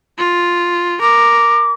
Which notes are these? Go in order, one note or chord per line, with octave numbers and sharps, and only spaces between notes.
F4
A#4 D6